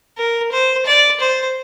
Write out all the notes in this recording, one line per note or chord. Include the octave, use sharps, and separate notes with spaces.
A#4
C5
D5
C5